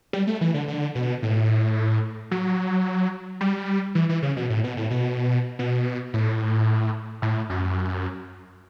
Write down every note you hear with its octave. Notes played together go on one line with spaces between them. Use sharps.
G3
A3
E3
D3
D3
B2
A2
F#3
G3
E3
E3
C#3
B2
A2
B2
A2
B2
B2
A2
A2
F#2